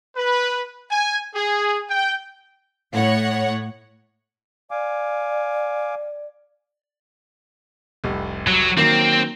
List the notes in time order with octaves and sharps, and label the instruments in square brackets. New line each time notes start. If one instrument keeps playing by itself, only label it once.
[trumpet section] B4
G#5
G#4
G5
[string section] A2 C#5 F#5
[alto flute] D5 [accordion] F5 G#5 D6
[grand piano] F1 C2
[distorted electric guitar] F#3
[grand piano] D#3 F#3 A#3 [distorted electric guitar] C4